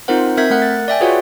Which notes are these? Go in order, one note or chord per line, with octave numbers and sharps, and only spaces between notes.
C4 D#4 F4 A#4 C5 F#5
C4 A#4 E5 G6 G#6 B6
A3 A#4 F#5 F#6
A6
D5 E5 G5 G#5
F4 F#4 G#4 B4 C#5 F#5